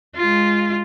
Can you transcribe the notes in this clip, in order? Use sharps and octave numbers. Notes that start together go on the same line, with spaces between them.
G#3 F4